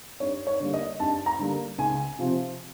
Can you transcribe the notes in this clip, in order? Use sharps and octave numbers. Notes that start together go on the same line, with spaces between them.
G2 C#5
C#5
D3 G3 A#3
D#5
G2 A5
A#5
D3 G3 A#3
C#2 G#5
C3 F3